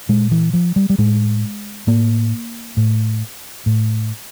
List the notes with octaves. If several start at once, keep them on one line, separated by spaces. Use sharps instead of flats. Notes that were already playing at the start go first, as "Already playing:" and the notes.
A#2 G#3
E3
F3
G3
G3
A2 G#3
A2 A#3
A2
A2